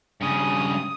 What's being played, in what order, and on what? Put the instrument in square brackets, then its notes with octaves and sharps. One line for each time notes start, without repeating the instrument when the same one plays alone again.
[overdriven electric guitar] G2 C#3 [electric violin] D#6